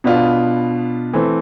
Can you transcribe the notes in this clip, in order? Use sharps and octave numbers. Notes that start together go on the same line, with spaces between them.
B2 B3 D4 F4
E3 A3 C4